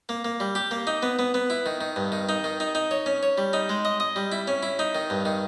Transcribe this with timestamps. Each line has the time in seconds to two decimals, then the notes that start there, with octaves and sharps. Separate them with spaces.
0.09 A#3
0.24 A#3
0.40 G3
0.55 G4
0.71 A#3
0.87 D#4
1.03 B3
1.19 B3
1.34 B3
1.50 E4
1.66 D#3
1.81 D#3
1.96 G2
2.12 D#3
2.29 D#4
2.44 D#3
2.60 D#4
2.75 D#4
2.91 C#5
3.06 C#4
3.23 C#5
3.38 G3
3.53 D#4
3.69 G#3
3.85 D#5
4.00 D#5
4.16 G3
4.32 E4
4.48 C#4
4.63 E4
4.79 D#4
4.95 D#3
5.10 G2
5.25 D#3